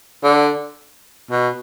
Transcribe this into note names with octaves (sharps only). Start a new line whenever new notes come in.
D3
B2